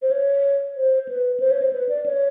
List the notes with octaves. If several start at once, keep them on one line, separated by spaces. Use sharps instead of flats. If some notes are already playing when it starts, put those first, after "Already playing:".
C5
C#5
C5
B4
C5
C#5
C5
B4
D5
C#5